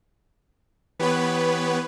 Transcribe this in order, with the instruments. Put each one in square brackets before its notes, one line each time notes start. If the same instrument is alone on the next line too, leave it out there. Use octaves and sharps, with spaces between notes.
[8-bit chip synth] E3 G4 C#5 [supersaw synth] B3 B4